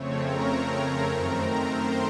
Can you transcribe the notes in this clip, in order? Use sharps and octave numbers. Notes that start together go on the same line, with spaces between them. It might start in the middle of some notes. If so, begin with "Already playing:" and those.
Already playing: F2 C#3 A3 C4 C#5
A#4 A#5
A#4 A#5
F#2 D#3 A3 C4
C5 C6